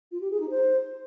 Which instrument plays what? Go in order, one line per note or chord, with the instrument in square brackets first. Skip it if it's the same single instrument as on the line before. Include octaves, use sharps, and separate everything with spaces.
[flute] F4
G4
G#4
D#4
C5